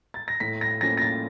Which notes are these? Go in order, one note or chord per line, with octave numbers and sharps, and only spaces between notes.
A6
A#6
A2 B6
A#6
F3 A#3 C#4 A#6
A#6
A6